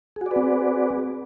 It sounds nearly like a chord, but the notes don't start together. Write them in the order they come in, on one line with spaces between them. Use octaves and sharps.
G#4 F#4 D5 B4 C4